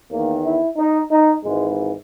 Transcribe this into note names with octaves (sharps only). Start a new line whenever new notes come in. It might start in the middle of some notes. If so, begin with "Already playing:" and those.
E2 D#3 A#3
E4
D#4
D#4
G#1 G#2 E3 G#3